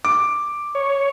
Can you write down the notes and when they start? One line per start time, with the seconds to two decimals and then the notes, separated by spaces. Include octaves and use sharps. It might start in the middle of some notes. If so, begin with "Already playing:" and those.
0.05 D6
0.75 C#5